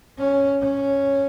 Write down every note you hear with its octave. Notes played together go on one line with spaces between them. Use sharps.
C#4
C#4